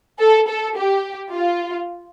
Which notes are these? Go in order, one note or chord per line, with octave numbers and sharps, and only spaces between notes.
A4
A4
G4
F4